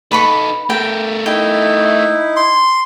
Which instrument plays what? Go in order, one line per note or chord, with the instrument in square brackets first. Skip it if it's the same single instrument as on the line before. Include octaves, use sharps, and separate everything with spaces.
[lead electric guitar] D#4 A4 [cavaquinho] B4 B5 C#6
[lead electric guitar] A3 A#4 [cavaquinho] G5
[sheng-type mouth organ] D#4 E4 [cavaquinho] G5
[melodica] C6